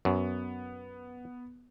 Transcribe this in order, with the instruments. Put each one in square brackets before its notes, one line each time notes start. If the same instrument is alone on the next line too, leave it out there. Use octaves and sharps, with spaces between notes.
[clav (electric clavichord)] F#2 [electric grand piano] B3